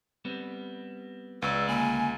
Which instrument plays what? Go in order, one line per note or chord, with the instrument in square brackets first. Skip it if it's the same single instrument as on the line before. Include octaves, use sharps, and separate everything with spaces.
[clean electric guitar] G3 B3 C4
[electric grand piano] C#2 [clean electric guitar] B4 C#5 D5 [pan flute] E6
[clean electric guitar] D2 A#3 B5 [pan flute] G#5